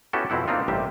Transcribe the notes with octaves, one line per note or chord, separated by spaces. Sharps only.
B3 C#4 E4 F#4 G4 A4
F2 B2 C4 E4 F#5
A#3 C4 D4 D#4 F4
A1 G2 C3 G3 G4 E5